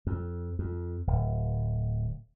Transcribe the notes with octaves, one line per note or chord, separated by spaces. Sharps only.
F2
F2
D1